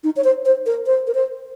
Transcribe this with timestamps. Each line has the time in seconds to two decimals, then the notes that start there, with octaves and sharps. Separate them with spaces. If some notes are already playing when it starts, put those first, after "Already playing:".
0.04 D#4
0.16 C#5
0.24 C5
0.45 C5
0.66 A#4
0.86 C5
1.07 A#4
1.15 C5